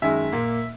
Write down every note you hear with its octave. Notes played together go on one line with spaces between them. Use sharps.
F#2 D#3 G#3 E5
A#2 A#3